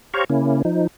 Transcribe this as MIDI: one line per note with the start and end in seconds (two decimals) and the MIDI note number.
0.14 0.24 67
0.14 0.24 72
0.14 0.24 73
0.14 0.24 77
0.14 0.24 82
0.14 0.24 85
0.30 0.62 49
0.30 0.62 58
0.30 0.62 61
0.30 0.62 64
0.65 0.87 53
0.65 0.87 63